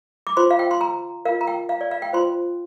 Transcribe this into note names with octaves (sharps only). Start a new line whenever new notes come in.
D6
F4 C5 C6
F5
G5
C6
A#5
F4 A#4 F5
A#5
G5
F5
D5
F5
G5
F4 C5 C6